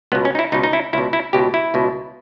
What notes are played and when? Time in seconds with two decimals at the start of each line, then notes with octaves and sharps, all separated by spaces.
0.12 C#2 B3
0.15 B2
0.25 C#4
0.35 D#4
0.39 E4
0.52 C#2 B2 D#4
0.63 D#4
0.73 E4
0.93 C#2 B2 E4
1.13 E4
1.33 C#2 B2 G4
1.54 E4
1.74 C#2 B2